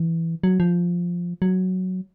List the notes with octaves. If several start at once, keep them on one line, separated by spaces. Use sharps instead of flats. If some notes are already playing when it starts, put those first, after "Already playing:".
Already playing: E3
F#3
F3
F#3